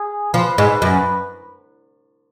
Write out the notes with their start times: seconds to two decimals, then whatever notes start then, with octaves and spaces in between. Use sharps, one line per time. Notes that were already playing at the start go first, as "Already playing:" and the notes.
Already playing: G#4
0.34 F3 B4
0.58 G#2
0.82 F#2